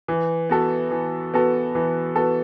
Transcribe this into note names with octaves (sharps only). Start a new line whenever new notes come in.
E3
B3 F#4 A4
E3
B3 F#4 A4
E3
B3 F#4 A4